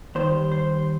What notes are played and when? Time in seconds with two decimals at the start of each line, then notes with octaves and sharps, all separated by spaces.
0.15 D#2 D#3 G3 C5
0.52 C5